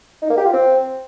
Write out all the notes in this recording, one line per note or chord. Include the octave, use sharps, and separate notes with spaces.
D#4
A#3
G4
F4
C4